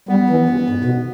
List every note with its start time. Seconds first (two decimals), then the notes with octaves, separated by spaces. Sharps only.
0.09 G3 B3
0.30 E3
0.49 G2
0.70 G#2
0.85 B2